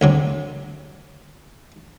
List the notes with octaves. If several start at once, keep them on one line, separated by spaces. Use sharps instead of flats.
D2 C3 F#3